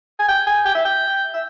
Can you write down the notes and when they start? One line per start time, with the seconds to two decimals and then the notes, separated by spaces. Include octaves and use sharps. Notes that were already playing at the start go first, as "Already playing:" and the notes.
0.20 G#5
0.29 G5
0.47 G#5
0.65 G5
0.75 E5
0.85 G5
1.34 E5